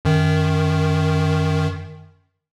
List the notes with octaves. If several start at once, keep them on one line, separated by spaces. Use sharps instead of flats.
F#2 D#3